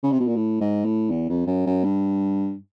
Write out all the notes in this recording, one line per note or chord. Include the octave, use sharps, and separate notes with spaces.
C#3
C3
B2
A#2
A2
G#2
A2
E2
F2
F#2
F#2
G2